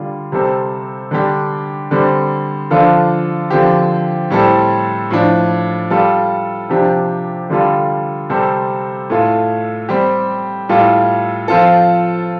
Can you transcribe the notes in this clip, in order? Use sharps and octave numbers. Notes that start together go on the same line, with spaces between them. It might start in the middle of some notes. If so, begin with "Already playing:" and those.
Already playing: D3 G3 F4
C3 G3 C4 A4
D3 G3 D4 G4
D3 G3 C4
D3 F3 D4 F4 A4
D3 F3 C4 G4
A2 G3 C4 A4
A2 F3 D4
G3 F4 A4
C3 F3 D4 G4
D3 G3 F4 A4
C3 G3 C4 A4
A2 A3 F4 A4
G3 C4 G4
A2 G3 F4 A4
F3 C4 F4 A4